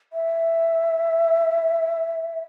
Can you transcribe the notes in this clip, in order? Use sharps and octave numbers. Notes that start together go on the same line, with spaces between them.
E5